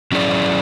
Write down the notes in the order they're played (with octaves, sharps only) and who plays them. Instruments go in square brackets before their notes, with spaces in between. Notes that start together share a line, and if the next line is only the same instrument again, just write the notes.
[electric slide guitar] F#3 C#4 E4 G#4 D5